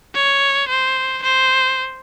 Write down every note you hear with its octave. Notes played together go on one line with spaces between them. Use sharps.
C#5
C5
C5